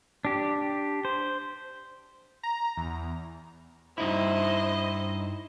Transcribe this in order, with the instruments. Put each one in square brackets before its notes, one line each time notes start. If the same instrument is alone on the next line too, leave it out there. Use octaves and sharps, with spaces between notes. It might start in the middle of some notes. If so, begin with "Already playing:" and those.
[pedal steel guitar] D4 G4
C5
[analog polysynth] A#5
E2
[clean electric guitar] G2 D#4 E4 [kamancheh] C5 D#5